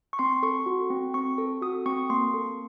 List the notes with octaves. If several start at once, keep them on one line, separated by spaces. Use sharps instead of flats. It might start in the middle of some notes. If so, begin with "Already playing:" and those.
C#6
C4 C6
A4 C#6
F#4
C4
C4 C#6
A4
F#4 D#6
C4 C#6
A#3 C6
A4